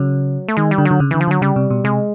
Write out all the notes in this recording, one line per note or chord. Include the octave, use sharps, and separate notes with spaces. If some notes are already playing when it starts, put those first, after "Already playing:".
Already playing: C#3 F#3
A3
D#3 G#3
G3
D3
F#3
D3
C#3
D3 E3
F3
D3 F#3
C#3 G3
C3
B2
C3 G#3